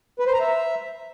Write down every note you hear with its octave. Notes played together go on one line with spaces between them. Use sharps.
B4
C5
A#5
E5